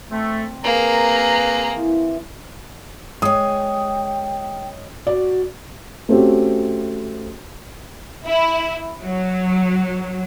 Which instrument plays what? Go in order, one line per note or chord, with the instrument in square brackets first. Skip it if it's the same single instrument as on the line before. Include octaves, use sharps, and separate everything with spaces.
[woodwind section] A3 [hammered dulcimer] C4
[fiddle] A#3 G#4 [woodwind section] A#4 B4 A#5
[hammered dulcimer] E3
[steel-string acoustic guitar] G#3 C#5 [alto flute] G5 [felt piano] D#6
[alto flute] F#4 [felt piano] D5
[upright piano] A3 C4 C#4 F#4 G4
[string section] E4
F#3